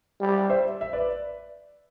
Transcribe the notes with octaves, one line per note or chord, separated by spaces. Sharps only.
G3
C5 E5
E5
B4 D5